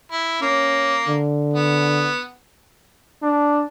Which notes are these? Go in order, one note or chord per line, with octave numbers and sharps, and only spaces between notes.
E4
A#3 C#4
D3
B3
D4